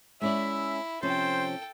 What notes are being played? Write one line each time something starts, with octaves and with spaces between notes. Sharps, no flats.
G#3 C#4 E4 D5 E5
C3 F3 C#4 A4 C5 G5